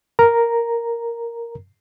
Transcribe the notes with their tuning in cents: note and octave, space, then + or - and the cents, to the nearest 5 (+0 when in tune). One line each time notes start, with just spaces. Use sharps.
A#4 +0 A#5 +0